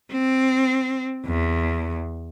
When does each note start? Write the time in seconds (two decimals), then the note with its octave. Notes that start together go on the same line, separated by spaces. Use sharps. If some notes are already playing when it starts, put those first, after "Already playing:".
0.12 C4
1.26 E2